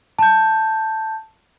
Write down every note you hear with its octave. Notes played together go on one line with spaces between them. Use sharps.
A5 G6